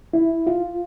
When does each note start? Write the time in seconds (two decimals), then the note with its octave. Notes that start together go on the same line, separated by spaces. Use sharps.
0.13 E4
0.47 F4